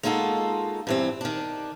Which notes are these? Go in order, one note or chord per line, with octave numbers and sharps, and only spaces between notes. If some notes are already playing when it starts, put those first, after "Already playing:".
G#3 A#3 D#4 F4 F#4 A4
G2 E3 C4
D#3 D4